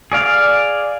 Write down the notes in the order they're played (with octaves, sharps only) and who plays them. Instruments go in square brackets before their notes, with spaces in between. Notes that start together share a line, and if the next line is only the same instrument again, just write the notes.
[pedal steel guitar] G#4 D5 F5